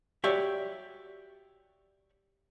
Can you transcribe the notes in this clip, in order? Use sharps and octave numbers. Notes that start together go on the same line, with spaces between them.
F#4 G4 C#5 D5 E5